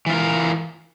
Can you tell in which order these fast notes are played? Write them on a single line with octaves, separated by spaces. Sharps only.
E3 F4 A#4